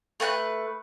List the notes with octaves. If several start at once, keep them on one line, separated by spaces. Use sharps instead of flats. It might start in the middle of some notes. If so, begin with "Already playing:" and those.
A3 B4 A5 F#6